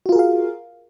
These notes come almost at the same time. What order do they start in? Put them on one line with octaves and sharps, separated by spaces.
F#4 F4 A#4 G#4 F5